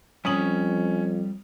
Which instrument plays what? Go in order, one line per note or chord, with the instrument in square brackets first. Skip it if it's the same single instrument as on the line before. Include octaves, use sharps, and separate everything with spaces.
[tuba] F2 [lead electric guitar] G3 C#5 [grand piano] C#4 D#6 F#7